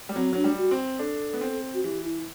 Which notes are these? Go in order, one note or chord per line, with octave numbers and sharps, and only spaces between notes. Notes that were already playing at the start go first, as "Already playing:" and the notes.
G3
F#3 C4
F#3 D4
G3
F#4
C4
D4 A4
B3
C4
F#4
E3 G4
E4